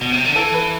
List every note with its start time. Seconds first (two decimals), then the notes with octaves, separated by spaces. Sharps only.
0.01 B2
0.12 C3
0.24 D3
0.36 E3 A4
0.54 B4